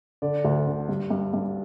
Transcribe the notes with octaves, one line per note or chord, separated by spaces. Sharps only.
D3 D5
D2
D3
G2
G2
G2